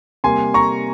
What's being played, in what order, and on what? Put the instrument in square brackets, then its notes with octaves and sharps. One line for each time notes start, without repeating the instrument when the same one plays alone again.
[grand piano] C3 G3 A#3 G#5 C6
A#5 C#6